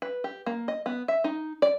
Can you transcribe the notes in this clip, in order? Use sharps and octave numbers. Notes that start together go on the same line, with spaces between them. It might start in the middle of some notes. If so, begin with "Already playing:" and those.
B4
G4
A#3
D#5
B3
E5
D#4
D5